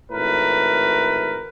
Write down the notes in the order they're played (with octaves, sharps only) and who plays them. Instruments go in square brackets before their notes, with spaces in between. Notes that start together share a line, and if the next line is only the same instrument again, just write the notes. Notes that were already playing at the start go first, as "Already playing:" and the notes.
[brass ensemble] G#1 A2 A#4 B4